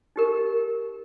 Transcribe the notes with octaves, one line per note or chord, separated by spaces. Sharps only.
D#4 G4 A#4